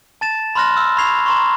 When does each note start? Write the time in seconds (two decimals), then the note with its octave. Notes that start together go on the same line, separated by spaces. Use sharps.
0.21 A5 A6 E7
0.55 B5 C6 F6 F#6 A#6
0.77 E6 F6
0.97 B5 C#6 G#6 C7 F7
1.26 A#5 C6 C#6